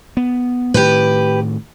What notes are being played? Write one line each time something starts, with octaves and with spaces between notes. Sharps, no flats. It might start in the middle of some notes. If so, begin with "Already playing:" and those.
B3
A2 D#3 G4 B4